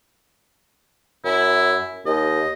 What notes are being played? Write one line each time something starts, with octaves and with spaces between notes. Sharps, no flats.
F#2 E4
D#2 D#5